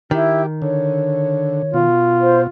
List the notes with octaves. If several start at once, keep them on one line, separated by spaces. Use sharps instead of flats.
D#3 E4 G4
D3 C#5
B2 F4
C5